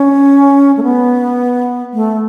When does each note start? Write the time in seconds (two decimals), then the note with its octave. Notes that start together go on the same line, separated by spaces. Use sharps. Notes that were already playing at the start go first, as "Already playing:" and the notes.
Already playing: C#4
0.77 A3
0.83 B3
1.93 A3